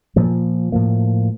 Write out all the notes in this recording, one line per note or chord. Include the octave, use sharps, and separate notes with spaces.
A#2 F3 A#3
A2 F3 A#3